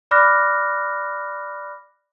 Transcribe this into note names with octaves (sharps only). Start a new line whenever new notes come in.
D5 B5 D6 F6 F#6 A#6